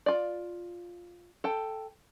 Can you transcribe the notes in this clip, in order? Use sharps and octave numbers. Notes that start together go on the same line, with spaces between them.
F4 D5
A4 G5